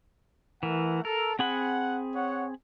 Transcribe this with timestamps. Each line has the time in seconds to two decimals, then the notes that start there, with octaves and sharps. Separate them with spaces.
0.63 E3 A3 A#4 F#5
1.05 A4 A#4
1.39 C4 G#4 F#5 B5
2.15 C#5 F#5